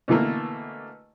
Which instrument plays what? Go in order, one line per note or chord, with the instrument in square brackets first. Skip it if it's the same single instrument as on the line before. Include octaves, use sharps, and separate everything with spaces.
[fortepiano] B2 D3 E3 A3 A#3